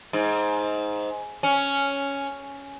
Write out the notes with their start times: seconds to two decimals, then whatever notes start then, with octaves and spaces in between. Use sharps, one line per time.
0.13 G#2
1.43 C#4